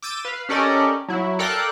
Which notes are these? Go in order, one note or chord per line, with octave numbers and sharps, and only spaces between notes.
D6 E6 G6 A6 D#7 E7
B4 F5
C#4 G4 A4 A#4 D5 D#5
F#3 E4
A4 A#4 D5 F5 G5 F#6